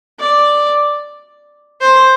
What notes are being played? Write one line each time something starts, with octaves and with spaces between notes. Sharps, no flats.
D5
C5